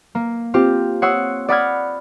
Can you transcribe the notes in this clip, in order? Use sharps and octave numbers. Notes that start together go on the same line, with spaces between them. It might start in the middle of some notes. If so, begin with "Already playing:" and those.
A#3
C4 F4 G4
C#5 F#5 C6 D#6 E6 C7
D5 F#5 B5 D#6 F6 G#6